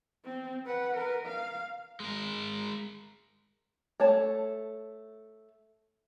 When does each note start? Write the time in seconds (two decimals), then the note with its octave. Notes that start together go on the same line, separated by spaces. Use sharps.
0.25 C4
0.66 B4 F#5
0.95 A#4 B4
1.26 F5
2.00 G#3 A#4
4.00 A3 C#5 A5